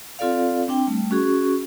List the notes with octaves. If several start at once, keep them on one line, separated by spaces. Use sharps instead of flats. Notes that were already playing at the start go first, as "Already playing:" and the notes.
C4 F4 A4 D5 F5
C4 D4 G5
G3 A3
C#4 F#4 G#4 C#6